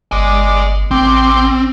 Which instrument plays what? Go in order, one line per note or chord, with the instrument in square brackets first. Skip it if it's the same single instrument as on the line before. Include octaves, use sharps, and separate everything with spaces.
[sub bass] G1 [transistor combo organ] D5 [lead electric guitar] D#5 G#5
[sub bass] A1 [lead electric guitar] C4 [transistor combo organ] G5 C6 D6